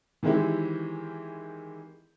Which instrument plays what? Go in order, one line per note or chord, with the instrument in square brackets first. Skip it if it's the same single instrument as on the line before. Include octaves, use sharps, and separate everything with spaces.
[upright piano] D#3 E3 G#3 C4 E4 G4